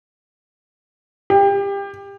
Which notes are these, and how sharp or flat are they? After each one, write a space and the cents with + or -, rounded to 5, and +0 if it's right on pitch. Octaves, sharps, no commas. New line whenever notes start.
G4 +25